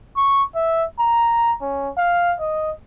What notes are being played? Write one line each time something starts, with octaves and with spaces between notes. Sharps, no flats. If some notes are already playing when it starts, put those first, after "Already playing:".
C#6
E5
A#5
C#4
F5
D#5